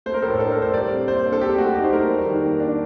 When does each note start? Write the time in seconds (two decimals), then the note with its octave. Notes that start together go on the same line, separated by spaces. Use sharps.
0.06 A3 C5
0.14 A#4
0.22 A2 A4
0.40 D4 A4
0.52 A#4
0.57 A2
0.62 C5
0.74 G3 D5
0.91 C3
1.08 A#3 C5
1.25 D4
1.33 A4
1.41 C4 G4
1.58 A3 F#4
1.75 D#4 G4
1.84 C5
1.92 A3 A#4
2.09 G3
2.26 D#3
2.43 A#3
2.60 D4